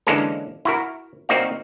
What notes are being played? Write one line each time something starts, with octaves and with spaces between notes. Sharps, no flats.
D3 E3 G#3 A#3 C#4 A4
E4 F#4 A#4
A#3 C4 D#4 F#4 D5 F5